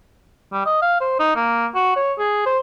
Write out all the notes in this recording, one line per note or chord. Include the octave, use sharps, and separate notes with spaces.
G3
D#5
F5
C5
D#4
A#3
F#4
C#5
G#4
C5